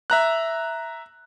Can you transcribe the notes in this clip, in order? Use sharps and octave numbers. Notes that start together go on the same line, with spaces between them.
E5 A#5 F#6